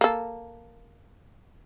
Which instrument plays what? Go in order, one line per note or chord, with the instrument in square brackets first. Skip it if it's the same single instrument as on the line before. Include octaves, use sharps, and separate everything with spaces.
[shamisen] A#3 A4